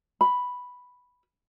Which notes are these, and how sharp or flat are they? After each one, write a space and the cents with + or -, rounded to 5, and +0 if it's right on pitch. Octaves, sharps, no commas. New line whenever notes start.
B5 +0